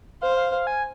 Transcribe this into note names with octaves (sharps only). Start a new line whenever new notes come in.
C5 F5
F5
F5
G#5